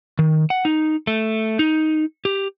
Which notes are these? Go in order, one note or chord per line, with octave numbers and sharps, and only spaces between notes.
D#3
F#5
D#4
A3
D#4
G4